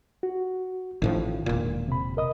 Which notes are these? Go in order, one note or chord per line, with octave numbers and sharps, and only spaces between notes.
F#4
A1 A2 D#3 F3
E1 A#2
C3 B5
A#4 D#5 D#6